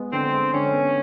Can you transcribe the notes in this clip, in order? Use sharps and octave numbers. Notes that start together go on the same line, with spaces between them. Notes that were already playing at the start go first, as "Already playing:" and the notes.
Already playing: G#3 B3
D3 C4
G#3
D3 C#4
B3